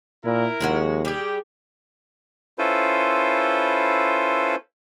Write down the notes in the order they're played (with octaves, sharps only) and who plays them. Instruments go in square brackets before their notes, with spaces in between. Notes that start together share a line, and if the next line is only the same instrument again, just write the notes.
[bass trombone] A#2 [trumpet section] E4 A#4
[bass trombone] D#2 [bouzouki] F3 G#3 F#4
[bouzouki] G3 G#4 [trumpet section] G4
[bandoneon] C#4 E4 F4 A4 B4 C5